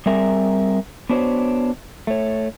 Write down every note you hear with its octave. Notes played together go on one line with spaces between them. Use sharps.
G3 C4 G#4 A#4 E5
B3 D4 F#4 C5 C#5
A3 C#5